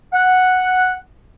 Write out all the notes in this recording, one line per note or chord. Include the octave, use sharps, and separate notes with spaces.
F#5